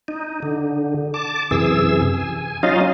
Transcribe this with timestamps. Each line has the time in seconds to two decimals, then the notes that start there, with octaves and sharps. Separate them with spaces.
0.08 D#4
0.42 D3
1.14 A5 D6
1.51 F#2 C3 E3 G#4 E6
2.14 G#5
2.63 F#3 C#4 D#4 F4 D#5 F5